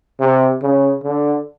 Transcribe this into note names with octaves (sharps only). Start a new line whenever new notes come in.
C3
C#3
D3